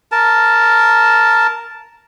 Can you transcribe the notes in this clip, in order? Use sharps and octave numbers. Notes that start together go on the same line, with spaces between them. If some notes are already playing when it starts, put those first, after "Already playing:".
A#4 A5